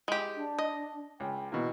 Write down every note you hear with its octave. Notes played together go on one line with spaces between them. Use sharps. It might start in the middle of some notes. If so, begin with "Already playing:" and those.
G#3 G4
D4
D#5
C#2 G5
B2 E3 A#3 F#4